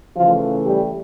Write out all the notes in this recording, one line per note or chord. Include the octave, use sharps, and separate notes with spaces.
C#3 E3 F3 A3 F4
G3 G4